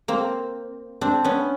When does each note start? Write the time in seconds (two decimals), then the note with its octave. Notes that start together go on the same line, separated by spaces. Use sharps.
0.08 A#3 C4
1.01 C4 D4
1.24 B3 C#4